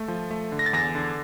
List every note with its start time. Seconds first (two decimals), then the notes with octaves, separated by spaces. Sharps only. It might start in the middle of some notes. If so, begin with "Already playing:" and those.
Already playing: A3
0.08 F3
0.31 A3
0.52 D3
0.59 A#6
0.66 A6
0.73 E2 A#6
0.95 D3